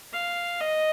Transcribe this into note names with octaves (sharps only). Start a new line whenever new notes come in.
F5
D#5